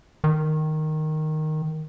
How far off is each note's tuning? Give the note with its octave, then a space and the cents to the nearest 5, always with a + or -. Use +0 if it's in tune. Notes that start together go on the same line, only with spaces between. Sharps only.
D#3 -5